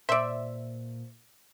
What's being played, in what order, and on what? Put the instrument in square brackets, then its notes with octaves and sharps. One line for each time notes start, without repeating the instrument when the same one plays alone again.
[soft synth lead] A#2 [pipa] C5 D5 [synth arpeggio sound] E5